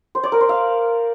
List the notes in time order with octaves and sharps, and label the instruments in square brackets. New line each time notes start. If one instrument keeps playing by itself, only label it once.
[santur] C5
D5
A#4
C5
F5